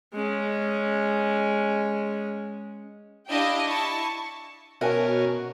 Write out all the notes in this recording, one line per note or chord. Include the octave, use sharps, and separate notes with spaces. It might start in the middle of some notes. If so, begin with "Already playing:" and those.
G#3 C#4
D4 E4 G4 D#5 F5 G5
E4 A5 C#6
B2 C#4 F#4 A#4 E5 G#5 A5